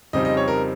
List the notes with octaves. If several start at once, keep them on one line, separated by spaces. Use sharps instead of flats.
F2 C#3 G3 C4 D#4 D#5
D#5
C#5
A#4